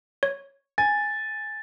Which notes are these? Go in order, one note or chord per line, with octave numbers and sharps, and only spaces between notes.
C#5
G#5 A6